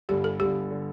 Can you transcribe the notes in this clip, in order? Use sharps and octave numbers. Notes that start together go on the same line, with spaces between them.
G1 G2 D3 G4
A4
G1 G2 D3 G4
D3